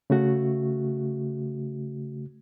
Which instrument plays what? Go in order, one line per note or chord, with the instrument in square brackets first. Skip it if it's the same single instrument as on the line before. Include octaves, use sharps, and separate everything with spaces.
[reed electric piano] C#3 A3 F#4